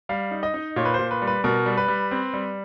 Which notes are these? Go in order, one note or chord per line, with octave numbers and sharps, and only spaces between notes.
G3 F5
D#4
D#5
D#4
A#2 C#5
B4
A#2 C5
B4
G3
B4
B2 A#4
G3
B4
G3
C4
G3